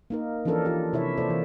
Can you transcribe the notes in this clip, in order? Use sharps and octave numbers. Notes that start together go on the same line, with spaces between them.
A#3 D#4 A#4
E3 F3 C#4 D4 A4 A#4
E3 D4 F4 G4
C3 E4 C#5 E5
C3 A#3 A4 C5 D5
E3